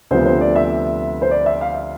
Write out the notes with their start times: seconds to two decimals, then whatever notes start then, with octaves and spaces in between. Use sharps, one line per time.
0.11 D2 C3 F3 B3 C5
0.26 C5
0.41 D5
0.56 E5
1.22 C5
1.31 D5
1.46 E5
1.61 F5